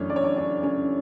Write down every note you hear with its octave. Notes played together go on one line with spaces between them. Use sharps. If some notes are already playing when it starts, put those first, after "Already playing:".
Already playing: F#2 E3 A3 C#4 D4 C#5
D5
C#5
D4 D5
D4 D5
C#4 C#5